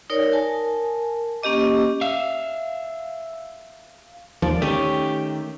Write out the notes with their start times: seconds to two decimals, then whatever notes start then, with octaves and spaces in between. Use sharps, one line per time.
0.10 D#4 A#4 C#5 D5
0.33 A#4 G#5 A5
1.42 A#3 C#4 G4 D#5 D6
2.01 E5 F5
4.42 D#2 F3 D5
4.62 D#3 A3 C#4 G4 D#5